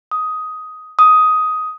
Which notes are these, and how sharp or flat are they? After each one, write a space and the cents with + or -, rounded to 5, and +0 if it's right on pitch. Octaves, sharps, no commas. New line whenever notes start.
D#6 +10
D#6 +10